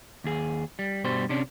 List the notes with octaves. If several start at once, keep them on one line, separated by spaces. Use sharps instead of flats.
D#2 G#4
G3
G2 B2 G3 C5
C3 C#4 D4